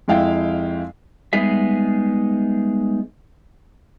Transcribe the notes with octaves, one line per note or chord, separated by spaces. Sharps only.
F2 G#3 E4 F5 G5
G3 G#3 B3 D#4 G#4 E5